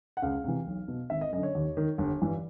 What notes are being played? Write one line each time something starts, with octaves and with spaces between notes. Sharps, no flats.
F#5
C#2 F5
C3 E3
B1
B2
G#1 E5
D#5
F#2 D3 D#5
C#5
D#2
D#3
G1
G2 E3